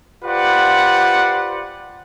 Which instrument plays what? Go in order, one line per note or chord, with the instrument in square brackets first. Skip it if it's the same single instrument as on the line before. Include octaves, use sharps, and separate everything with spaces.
[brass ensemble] F4 G4 B4 C5 D5 F#5